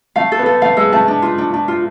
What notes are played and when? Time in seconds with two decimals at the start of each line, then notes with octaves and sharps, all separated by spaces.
0.16 A3 F5
0.32 A4
0.39 B3
0.46 A4
0.62 A3 F5
0.77 G#3 A4
0.92 A3 A5
1.08 D4
1.22 F4
1.38 D4
1.54 D4
1.68 F4